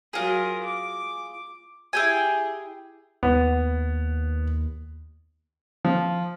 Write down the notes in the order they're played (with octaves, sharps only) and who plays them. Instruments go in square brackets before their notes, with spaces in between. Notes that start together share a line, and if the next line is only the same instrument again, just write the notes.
[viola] F#3 A#4 [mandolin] F4 G#4
[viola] D6
[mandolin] E4 G5 G#5 [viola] G4 G#4
[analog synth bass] D#2 [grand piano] B3
[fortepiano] F3